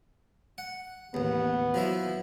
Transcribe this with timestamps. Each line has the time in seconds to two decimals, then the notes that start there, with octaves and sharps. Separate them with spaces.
0.58 F#5
1.14 A1 D#2 B3
1.74 F3 F#3 E4